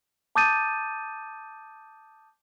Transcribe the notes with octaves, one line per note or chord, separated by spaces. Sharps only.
A5 D6 D#6 G6 A6 D#7